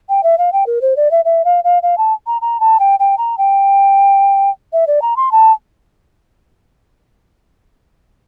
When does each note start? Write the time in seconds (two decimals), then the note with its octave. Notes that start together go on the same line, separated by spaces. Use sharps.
0.09 G5
0.23 E5
0.38 F5
0.53 G5
0.66 A#4
0.82 C5
0.96 D5
1.11 E5
1.25 E5
1.45 F5
1.64 F5
1.83 F5
1.98 A5
2.27 A#5
2.42 A#5
2.60 A5
2.80 G5
3.00 G5
3.18 A#5
3.38 G5
4.73 E5
4.87 D5
5.02 A#5
5.17 C6
5.32 A5